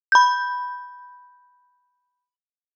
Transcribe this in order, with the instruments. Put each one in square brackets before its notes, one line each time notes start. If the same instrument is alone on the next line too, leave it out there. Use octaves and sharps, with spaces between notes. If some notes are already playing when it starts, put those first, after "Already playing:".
[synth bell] B5 G6